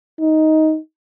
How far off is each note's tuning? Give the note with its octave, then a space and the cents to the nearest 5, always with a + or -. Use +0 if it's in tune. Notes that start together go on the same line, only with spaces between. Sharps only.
D#4 +10